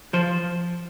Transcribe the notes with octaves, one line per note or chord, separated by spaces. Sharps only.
F3 C5